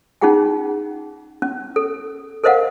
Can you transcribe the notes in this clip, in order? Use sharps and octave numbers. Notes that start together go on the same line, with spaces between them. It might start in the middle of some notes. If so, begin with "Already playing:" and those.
C#4 D#4 F4 G#4 F#5 G5
C#4
A4
A4 A#4 C5 D#5 F5 F#5